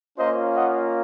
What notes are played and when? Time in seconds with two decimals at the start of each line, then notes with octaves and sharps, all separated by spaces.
0.17 A#3 C#4 F4 C5 D#5
0.55 D#5 F#5